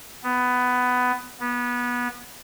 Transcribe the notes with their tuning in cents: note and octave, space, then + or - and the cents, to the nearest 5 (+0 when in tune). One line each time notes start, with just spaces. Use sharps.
B3 +15
B3 -20